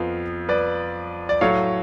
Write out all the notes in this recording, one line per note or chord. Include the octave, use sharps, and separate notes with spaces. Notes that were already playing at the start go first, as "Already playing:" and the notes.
Already playing: F2 F3 B3 F5
B4 D5
D5
A2 F#3 A3 C#5 F5